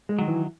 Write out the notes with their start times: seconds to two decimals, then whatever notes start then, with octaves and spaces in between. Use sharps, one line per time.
0.09 G#3
0.19 D#3 F#3
0.28 E3